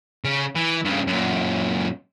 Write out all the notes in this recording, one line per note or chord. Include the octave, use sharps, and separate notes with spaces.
C#3
E3
G2 C#3
F#2 A#2